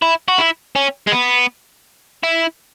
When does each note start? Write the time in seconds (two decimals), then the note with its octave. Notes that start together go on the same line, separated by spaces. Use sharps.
0.02 E4
0.28 F#4
0.38 E4
0.75 C#4
1.07 G#3
1.12 B3
2.24 E4